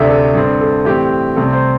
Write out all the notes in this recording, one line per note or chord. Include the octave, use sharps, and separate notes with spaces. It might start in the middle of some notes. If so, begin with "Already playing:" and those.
Already playing: D2 C3 A3 D4 E5
A4
G2 D3 C4 A4
A4
A2 E3 C4 G4
C2 C3 A3 C4 A4
C5